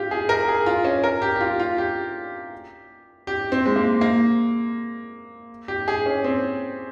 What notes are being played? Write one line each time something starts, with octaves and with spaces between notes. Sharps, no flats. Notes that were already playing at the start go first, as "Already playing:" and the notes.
Already playing: F4 G4
G#4
A#4
G#4
F4
C#4
A#4
G4
G4
F4
F4
G4
G4
C4
G#3
A#3
A#3
G4
G#4
C#4
C4